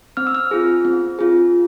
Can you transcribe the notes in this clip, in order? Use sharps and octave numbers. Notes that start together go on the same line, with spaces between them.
C4 F6
E6
F6
F4 G#4
C4
F4 G#4